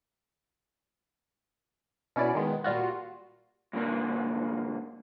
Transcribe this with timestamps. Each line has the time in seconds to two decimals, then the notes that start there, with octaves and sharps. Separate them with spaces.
2.16 B2 C#4 E4 D5
2.35 D#3 G#3 B3
2.64 A#2 G3 F4 F#4
3.73 G2 A#2 D3 A#3 D4